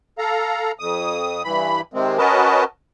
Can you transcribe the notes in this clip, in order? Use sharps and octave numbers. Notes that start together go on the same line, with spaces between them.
A4 F5 A#5
F2 D#6
G2 E3 B5
C3 D#3 G#3 C4
C#4 F#4 A#4 B4 D#5 A5